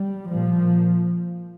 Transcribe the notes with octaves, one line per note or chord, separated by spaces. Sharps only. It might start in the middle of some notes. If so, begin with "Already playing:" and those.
Already playing: G3
A#2 F3